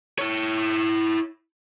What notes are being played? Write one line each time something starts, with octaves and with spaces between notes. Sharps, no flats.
E4 C#5